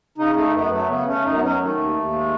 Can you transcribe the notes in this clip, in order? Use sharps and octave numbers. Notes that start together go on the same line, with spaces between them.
C#3 D#4
A3 D#4
F#2 B3
F#3 A3
C#3 B3
A3 C#4
F#2 D#4
B3
F#3 C#4
D#3 A3
D#2
D#2
G#3